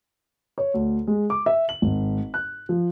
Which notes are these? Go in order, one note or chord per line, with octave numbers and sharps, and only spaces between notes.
C#5
D2
G#3
D6
E5
F#7
G#1
F#6
F3